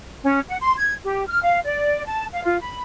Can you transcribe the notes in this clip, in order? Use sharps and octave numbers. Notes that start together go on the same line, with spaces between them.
C#4
F#5
C6
G#6
G4
F6
F5
D5
A5
F5
F4
B5